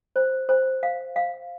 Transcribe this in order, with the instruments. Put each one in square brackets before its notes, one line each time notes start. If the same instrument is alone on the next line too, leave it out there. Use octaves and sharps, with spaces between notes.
[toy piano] C5
C5
F5
F5